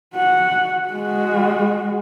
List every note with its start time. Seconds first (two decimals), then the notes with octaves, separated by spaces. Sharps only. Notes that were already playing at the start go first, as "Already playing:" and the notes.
0.14 F#4 F#5
0.89 G#3 F#4